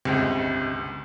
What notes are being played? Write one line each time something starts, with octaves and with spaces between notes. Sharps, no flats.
G1 C#2 C3 G#3